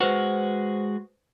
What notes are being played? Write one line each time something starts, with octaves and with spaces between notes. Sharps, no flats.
G#3 F#4 B4 C5